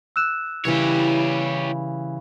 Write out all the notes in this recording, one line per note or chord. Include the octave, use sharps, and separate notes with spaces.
E6 F#6 E7
C#3 E3 G3 E4 G4 C#5